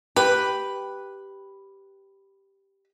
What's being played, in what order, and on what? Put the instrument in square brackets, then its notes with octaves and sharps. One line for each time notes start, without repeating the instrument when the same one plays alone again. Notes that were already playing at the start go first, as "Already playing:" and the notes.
[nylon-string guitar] G4 [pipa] B4